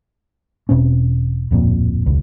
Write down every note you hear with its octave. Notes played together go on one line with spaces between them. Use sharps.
E1 B2 C4 C#4
D1 F2 A#2
E1 C#2